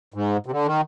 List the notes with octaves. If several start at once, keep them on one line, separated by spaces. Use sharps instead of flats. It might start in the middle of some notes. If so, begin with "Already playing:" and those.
G#2
C3
D3
D#3